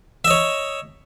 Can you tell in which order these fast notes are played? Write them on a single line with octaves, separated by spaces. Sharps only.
E5 D#5 C#5